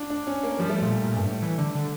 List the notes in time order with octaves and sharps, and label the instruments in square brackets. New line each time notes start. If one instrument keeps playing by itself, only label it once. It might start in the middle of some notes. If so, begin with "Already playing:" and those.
Already playing: [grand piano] D4 F4
D4
C#4
A#3
[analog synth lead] F3 [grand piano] G3
[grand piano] A3
[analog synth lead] A#2 [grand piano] G3
[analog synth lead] A#2
G2
A2
E3
D3
D3